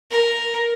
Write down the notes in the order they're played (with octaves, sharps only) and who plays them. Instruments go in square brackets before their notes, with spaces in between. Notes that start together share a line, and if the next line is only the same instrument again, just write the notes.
[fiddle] A#4